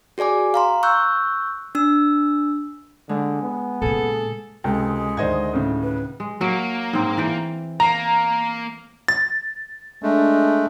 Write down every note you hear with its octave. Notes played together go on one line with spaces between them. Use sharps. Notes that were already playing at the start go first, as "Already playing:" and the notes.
F#4 G#4 D5 G#5 D6
F5 A#5 C6
C#6 E6 F#6 G6
D4 E6
D3 G#3
B3
A#2 C#3 G#4 A4
C#2 C3 G#3 A4 G5
D2 D#3 C5 D5 D#5 G#6
A2 C#3
B4
G#3
F#3 A#3
G#2 C4
E3 G5
A#3 A#5
A6
G#3 A3 D4